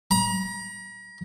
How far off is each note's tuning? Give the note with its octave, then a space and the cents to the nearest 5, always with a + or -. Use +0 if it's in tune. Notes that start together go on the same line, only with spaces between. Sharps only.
A#5 +40